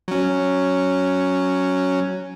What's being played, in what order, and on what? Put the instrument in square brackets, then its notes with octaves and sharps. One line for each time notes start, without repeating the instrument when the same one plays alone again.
[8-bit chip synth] F#3 C#4